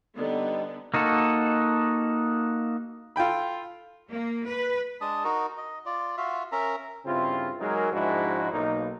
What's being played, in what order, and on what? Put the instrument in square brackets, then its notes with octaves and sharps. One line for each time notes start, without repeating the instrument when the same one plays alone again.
[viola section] D3 B3 [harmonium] G3 D#4
[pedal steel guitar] A#3 D#4 F#4 A4
[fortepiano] F4 A4 G5 B5
[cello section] A#3
B4
[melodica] G#3 D4 A5 D#6
D#4 F#4 A#4
D#5
F4 D5
F4 F#4 E5 F5
C#4 A#4 E5 A#5
[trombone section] G2 C#3 C4 E4 F4
F#3 G#3 D#4 G#4 A#4
G#2 F3 G#3 D4 E4 F#4
B1 A#3 D#4